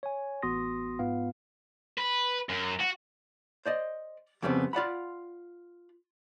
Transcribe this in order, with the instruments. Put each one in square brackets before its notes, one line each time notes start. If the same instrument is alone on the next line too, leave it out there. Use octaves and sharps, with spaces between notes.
[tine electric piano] C#5 G#5
A1 B3 F#4 C6 D#6 A#6
G#2 B3 F4 F5
[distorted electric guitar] B4
F#2
F#4
[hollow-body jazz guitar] C5 D5 D#5
F2 C#3 G3 G#3 B3 C4
F4 D5 F#5 B5